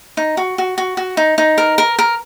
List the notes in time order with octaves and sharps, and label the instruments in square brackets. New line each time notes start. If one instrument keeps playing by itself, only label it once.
[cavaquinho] D#4
F#4
F#4
F#4
F#4
D#4
D#4
A#4
A#4
A#4